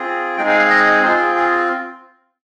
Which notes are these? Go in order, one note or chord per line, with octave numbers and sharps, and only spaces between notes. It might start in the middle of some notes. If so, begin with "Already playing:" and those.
Already playing: C4 F4 G#4
G#3 C4 D#4 G#4 G5
F5
F5
D#5
C4 F4 G#4 C5
G#4